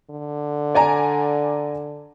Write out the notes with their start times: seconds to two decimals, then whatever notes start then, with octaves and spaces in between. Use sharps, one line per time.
0.10 D3
0.75 D5 G#5 A#5